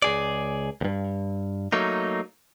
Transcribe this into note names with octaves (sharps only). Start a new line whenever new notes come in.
C#2 G#4 D5
D2 G2
F#3 A3 A#3 D#4